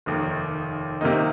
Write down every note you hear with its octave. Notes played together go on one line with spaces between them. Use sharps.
F1 D#2 D#3
C3 D#3 A#3 D#4